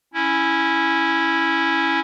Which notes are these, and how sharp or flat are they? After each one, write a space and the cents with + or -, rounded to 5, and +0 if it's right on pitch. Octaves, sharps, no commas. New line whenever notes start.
C#4 +0 E4 +0